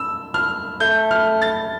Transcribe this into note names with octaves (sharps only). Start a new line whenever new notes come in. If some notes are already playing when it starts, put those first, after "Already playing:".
Already playing: E6
F6
A3 G6
F6
A6